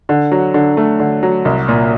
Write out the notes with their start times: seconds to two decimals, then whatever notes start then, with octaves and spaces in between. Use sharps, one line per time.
0.09 D3
0.32 F#3
0.54 D3
0.77 A3
1.00 D3
1.23 F#3
1.45 C2
1.68 A#2